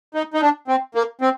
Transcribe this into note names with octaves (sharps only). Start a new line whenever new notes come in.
D#4
D#4
D4
C4
A#3
C4